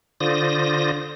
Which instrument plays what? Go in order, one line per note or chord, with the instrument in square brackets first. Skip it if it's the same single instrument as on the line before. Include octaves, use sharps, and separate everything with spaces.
[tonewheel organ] D3 F4 C5 D5 D#6 A#6